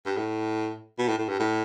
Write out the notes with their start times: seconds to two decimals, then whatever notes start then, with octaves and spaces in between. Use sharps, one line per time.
0.06 G2
0.17 A2
0.99 B2
1.08 A2
1.18 A2
1.29 G2
1.40 A2